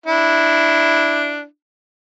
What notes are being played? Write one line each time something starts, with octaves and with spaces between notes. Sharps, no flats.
D4 E4